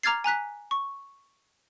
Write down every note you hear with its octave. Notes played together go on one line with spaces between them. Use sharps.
A#5 D6 F6 G#6 A6 C7
G#5 A#5 F#6 B6
C#6